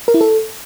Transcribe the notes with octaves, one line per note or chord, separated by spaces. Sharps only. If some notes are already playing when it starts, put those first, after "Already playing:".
A#4
E4
A4